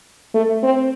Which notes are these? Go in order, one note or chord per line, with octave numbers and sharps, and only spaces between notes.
A3
C4